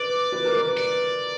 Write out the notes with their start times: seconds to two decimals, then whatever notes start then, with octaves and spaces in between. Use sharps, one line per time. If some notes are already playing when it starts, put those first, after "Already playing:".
Already playing: B4 D5
0.32 B4
0.45 A#4
0.57 B4
0.77 D5